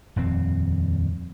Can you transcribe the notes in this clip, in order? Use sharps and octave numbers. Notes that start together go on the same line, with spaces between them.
D#1 F2 C4